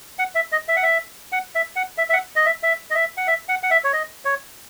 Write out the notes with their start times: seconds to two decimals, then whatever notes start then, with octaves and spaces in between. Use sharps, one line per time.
0.19 F#5
0.35 E5
0.52 D#5
0.68 E5
0.76 F#5
0.83 E5
1.32 F#5
1.55 E5
1.76 F#5
1.98 E5
2.09 E5
2.13 F#5
2.36 D#5
2.46 E5
2.63 E5
2.90 D#5
2.95 E5
3.17 F#5
3.27 E5
3.49 F#5
3.63 F#5
3.71 E5
3.84 C#5
3.93 D#5
4.25 C#5